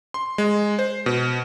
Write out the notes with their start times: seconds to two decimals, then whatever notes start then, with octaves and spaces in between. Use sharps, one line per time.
0.14 C6
0.38 G#3
0.79 C5
1.06 B2